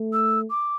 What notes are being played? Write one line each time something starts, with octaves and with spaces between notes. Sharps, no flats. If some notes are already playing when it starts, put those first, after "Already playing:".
Already playing: A3
E6
D6